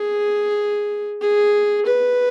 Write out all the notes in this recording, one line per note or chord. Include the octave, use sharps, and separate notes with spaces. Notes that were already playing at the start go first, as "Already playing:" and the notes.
Already playing: G#4
G#4
B4